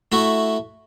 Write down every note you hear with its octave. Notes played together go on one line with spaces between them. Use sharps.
A3 E4 F#4